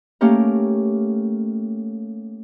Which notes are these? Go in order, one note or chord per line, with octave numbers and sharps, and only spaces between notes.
A3 A#3 C#4 G4 A#4